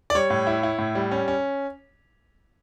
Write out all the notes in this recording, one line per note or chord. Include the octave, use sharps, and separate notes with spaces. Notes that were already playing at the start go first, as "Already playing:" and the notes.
D5
G3 C#5
A2
E4
E4
A2
G3
C#4
C#4